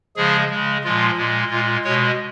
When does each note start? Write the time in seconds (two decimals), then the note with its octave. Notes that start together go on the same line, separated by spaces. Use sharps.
0.16 C#3 F3 G#3 G#4
0.51 C#3 G#3
0.84 A#2 F3 G#3 F4
1.17 A#2 G#3
1.50 A#2 G#3 F4
1.84 B2 G#3 C#5